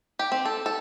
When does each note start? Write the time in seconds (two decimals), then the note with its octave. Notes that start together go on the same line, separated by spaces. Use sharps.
0.19 G4
0.32 C4
0.45 A4
0.66 A4